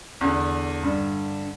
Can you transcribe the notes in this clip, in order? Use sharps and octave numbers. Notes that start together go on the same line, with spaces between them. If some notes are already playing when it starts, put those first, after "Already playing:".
E2 D3
G2 D3